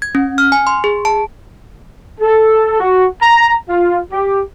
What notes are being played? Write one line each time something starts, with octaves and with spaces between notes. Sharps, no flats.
G#6
C#4
F6
G#5
C6
G#4
A5
A4
F#4
A#5
F4
G4